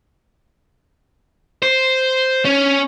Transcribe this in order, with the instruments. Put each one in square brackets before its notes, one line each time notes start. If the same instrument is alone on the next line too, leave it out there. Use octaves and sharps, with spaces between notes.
[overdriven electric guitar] C5
C#4